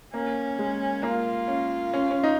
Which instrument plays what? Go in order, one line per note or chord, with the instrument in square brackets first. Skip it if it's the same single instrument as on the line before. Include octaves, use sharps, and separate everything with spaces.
[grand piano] A#3 [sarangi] C#4
[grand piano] G#3
[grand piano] A#3 [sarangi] F4
[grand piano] C#4
C#4
C#4
D#4